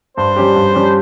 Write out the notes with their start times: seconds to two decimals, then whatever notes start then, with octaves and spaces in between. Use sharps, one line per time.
0.17 G2 C5
0.36 G3 C#4 G4
0.56 G2
0.74 G3 C#4 G4